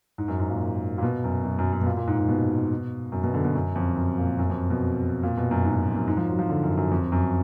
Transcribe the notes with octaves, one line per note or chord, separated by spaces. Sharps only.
G#2
F#2
G#2
A#2
A#2
B2
F#2
F#2
F#2
F#2
B2
A#2
A#2
G#2
G#2
B2
F#2
B2
D3
B2
F#2
F2
F#2
A#2
F#2
F2
B2
A#2
B2
F#2
G#2
G#2
F2
F#2
G#2
F3
F#3
F3
D3
F#2
F#2
F2
F#2